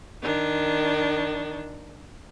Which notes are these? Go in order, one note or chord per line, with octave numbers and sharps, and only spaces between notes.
D#3 D4